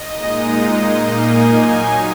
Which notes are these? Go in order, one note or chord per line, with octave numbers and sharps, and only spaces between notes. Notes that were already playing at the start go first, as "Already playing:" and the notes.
Already playing: D#5
A#2 G#3 D#4
A#2 A#3 D#4
G#5
F#3 D#4